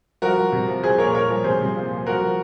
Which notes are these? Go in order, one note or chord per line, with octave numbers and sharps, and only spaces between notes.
F3 F#4 A#4
F3
C3
F3
F3 G#4 C5
A#2 A#4 C#5
A#2 A#4 C#5
F3
C3 G#4 C5
C3
A#2
F3
F3 F#4 A#4
F3